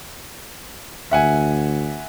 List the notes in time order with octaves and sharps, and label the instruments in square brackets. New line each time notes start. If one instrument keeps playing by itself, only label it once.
[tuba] D2 [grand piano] E5 F#5 G#5